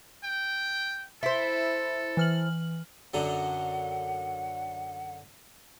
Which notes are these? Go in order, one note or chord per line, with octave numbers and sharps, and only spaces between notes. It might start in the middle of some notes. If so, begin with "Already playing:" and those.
G5
E4 A4 C5
E3 F6 F#7
F#2 D3 F#3 F#5